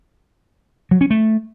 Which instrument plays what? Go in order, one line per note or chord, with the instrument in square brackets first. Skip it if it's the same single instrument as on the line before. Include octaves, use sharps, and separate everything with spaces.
[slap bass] F#3
C#4
A3